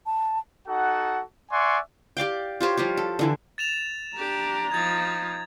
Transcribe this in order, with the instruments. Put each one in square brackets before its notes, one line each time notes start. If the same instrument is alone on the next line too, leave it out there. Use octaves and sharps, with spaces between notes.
[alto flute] A5
[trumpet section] D#4 F#4 A4 F#5
D5 E5 F#5 G#5 C6 C#6
[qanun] G4 D5 F5 G5
F4 G4 C5 C#5
F3 G3 F4 G4
A4
D3 E3 E4
[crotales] A6 E7 F7
[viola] D4 G4 [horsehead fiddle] A#5
[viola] F3 D#4 [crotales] G#6 A6